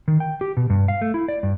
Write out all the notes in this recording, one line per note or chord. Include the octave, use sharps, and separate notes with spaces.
D#3
G5
G4
B2
G2
F5
A3
E4
D5
G2